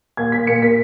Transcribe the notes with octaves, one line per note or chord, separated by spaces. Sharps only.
A#2 G#6
A#2 B6
A#2 C#7
A#3 B6